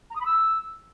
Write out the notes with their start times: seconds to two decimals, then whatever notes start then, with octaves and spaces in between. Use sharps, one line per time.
0.10 A#5
0.15 D#6
0.20 B5
0.26 E6